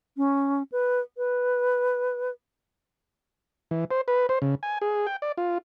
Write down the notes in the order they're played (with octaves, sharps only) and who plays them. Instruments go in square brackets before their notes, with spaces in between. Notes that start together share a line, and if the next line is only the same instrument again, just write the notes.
[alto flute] C#4
B4
B4
[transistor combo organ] E3
C5
B4
C5
C#3
G#5
G#4
G5
D5
F4